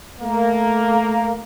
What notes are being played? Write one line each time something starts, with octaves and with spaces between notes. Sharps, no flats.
A3 A#3